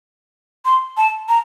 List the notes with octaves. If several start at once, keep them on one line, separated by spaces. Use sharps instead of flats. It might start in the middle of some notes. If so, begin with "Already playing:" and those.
C6
A5
A#5